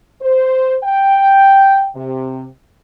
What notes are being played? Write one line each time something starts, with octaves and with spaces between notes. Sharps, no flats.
C5
G5
C3